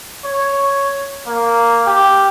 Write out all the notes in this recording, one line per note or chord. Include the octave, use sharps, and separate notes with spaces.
C#5
A#3
G4